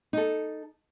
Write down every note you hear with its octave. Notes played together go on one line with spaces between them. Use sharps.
D#4 A4